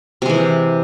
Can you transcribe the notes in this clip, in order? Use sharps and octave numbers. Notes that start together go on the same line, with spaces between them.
C3 E3 G#3